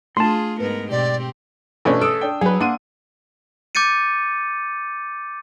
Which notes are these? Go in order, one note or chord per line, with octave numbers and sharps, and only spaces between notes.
A3 D4 F4 G#4 A5 C6
G#2 B3 A#4 B4
B2 C4 G4 D5
B2 E3 A3 C#4 D4
A4 D#6 E6 D7
D4 G5
F#3 G#4 B4
A#3 D4 F#5 C6 D#7
D6 G6 A6 C#7 D#7